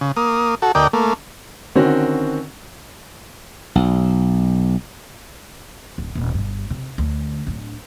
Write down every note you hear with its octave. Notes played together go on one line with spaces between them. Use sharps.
C#3
A#3 D#6
F#4 A4
D2 A#4 D5 D#5 G5
A3 A#3
D3 D#3 C4 C#4 F#4
B1
D1
D#1 C3
G1 G2
C3
D2
D1 D4